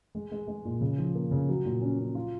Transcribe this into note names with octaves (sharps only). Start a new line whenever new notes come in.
G#3
G#3
G#3
A#2
C#3
F3
A#3
C#3
F#3
A#2
C#4
C#4
F4